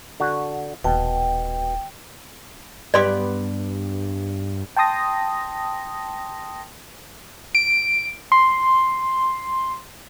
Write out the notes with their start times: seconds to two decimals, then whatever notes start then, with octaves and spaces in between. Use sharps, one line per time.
0.20 D3 F#4
0.84 D#1 B2 G5 A5
2.94 G2 B3 G4 D5 C6 D6
4.76 G5 A5 C6 D#6 A#6
7.55 D7
8.32 C6